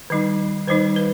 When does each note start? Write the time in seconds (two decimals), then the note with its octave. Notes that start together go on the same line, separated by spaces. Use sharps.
0.10 D#3 G3 D#4
0.68 D#3 G3 D#4 C5
0.96 B4